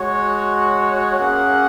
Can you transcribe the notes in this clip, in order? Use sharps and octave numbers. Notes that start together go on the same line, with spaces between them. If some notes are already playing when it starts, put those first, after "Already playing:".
Already playing: G#3 F#4 C#5
A#3 C#4 G#4 F#5